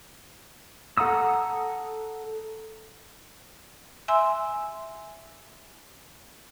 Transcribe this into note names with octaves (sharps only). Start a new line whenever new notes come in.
A4 F#5 A#5 D#6 E6
E5 G#5 C6 E6